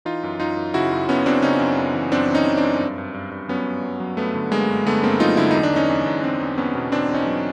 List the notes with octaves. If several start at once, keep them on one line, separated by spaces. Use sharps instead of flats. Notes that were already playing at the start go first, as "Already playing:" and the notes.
E3 D#4 F4
F#2
F#2 D#4 F4
F#2
C#3 E4 F#4
F#2
F#2 B3 C#4
F#2 C4 D4
C#3 C#4 D#4
F#2
F#2
E3
F#2 C4 D4
E3
C#4 D#4
E3
C4 D4
F#2
G2
G2
G2
G2
F#3 B3 C#4
G2
F#3
F#3
G2 A3 B3
D3
G2 G#3 A#3
G2
D3 A3 B3
G2 A#3 C4
F#3 D#4 F4
D3 E4
E2 D#4
D4
E2 C#4 D#4
E2
E2
E2 C4 D4
E2
E2 B3 C#4
B2
E2 C4 D4
E2
C#4 D#4
F#3